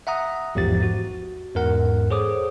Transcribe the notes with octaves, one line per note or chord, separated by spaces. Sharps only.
E5 F#5 A#5 D#6
A1 E2 G#2 F3 G4 A6
F#4
E2 G#2 A#4 F#5
G#4 A4 C5 C#5 D6 D#6